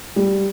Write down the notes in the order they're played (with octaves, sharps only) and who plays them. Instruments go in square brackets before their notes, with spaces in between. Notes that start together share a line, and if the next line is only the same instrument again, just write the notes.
[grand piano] G3